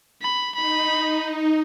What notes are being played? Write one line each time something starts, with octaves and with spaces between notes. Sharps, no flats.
B5
D#4 B5